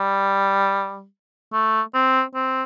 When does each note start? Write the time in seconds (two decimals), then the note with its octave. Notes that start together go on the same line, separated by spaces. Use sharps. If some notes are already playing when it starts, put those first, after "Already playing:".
Already playing: G3
1.53 A3
1.94 C4
2.35 C4